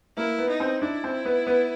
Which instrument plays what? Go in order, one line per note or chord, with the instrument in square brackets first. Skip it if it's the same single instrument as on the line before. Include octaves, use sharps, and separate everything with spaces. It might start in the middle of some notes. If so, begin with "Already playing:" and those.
[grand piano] A#3 [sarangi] E4
[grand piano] B3
[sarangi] D#4
[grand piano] C4
[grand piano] D4 [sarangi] E4
[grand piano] C4
B3
B3